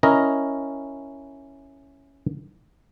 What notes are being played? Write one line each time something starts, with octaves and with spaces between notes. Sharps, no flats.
C#4 E4 A#4 D#5